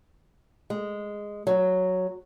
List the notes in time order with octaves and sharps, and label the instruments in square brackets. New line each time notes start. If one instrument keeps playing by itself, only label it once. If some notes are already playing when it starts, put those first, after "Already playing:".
[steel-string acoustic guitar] G#3
F#3